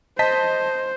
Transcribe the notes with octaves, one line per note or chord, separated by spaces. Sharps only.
C5 D#5 A5 B6